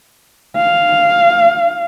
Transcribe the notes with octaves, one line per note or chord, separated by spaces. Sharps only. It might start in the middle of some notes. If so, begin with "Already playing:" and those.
F5